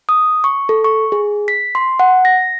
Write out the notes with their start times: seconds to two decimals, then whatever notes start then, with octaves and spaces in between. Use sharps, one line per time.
0.09 D#6
0.44 C#6
0.69 A4
0.84 C#6
1.12 G#4
1.48 B6
1.75 C6
2.00 F#5
2.25 A#6